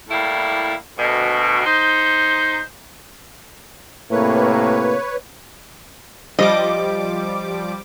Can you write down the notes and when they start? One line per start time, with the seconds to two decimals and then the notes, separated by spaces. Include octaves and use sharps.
0.09 A2 G3 A#3 E4
0.98 D2 B2
1.64 D#4 C5
4.11 A2 C3 A#3 B4 C#5
6.39 F3 G3 D#5 D6